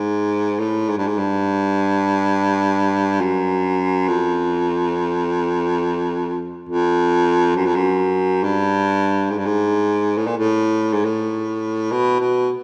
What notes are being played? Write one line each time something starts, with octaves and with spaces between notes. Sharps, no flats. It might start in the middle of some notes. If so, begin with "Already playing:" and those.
Already playing: G#2
A2
G#2
G2
G#2
G2
F#2
F2
F2
F#2
F2
F#2
G2
G#2
G2
G#2
A2
A#2
A2
G#2
A2
B2
B2